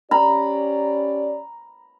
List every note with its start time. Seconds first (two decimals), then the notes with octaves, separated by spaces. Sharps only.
0.11 C#4 G4 D5 A#5 B5